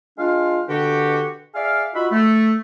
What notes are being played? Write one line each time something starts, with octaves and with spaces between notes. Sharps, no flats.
G#3 D4 F4 F5
B2 D3 D4 F#4 G4
G#4 D5 E5 F5
D#4 F4 F#4 E5 F#5 B5
A3